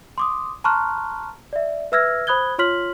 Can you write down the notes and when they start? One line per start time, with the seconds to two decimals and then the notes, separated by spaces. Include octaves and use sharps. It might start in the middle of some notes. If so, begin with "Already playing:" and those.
0.18 C6 D6 D#6
0.64 A5 A#5 C6 C#6 F6 F#6
1.53 D5 E5
1.92 B4 E5 E6 F6 G#6 A#6
2.27 C5 B5 D#6 F#6 G#6 G7
2.58 F4 C#5 C6 F6 B6 F#7